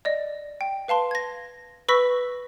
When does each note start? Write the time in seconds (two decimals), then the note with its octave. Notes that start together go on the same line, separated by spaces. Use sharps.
0.05 D5 D#5
0.61 G5
0.88 B4 F5 A5 C6
1.11 G#6 A#6
1.89 B4 B5 C#6 E6 A#6 B6